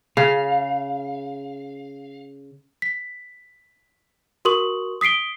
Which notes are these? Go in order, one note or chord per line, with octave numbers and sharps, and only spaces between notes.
C#3 F5
B6
F#4 A#4 C6 C#6 D#6 F#7
D#6 B6 C7 D7 G7